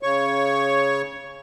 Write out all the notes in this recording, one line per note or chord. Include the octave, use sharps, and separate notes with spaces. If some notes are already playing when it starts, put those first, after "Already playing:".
C#3 C#5 C#6